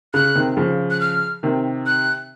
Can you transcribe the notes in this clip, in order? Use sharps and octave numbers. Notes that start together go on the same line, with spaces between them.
C#3 F#6
C3 D#3
C#3 F3
F#6
F6
C3 D#3
F#6